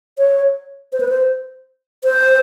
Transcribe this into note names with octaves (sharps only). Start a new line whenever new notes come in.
C#5
C5
B4
C5
C5